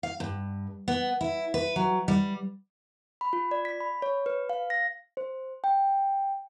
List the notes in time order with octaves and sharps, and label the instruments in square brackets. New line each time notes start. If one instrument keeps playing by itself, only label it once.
[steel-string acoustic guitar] F5
G2
B3
E4
B4
F#3
G3
[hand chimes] B5
F4
D5
B6
B5
C#5
B4
F5
A#6
C5
G5